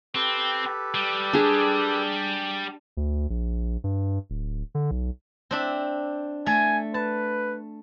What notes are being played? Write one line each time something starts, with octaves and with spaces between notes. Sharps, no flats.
C4 G4 A4 B4
G3
D4 G#4
D2
A#1
G2
D1
D3
B1
C4 D4 E5
A3 G#5
B4 A5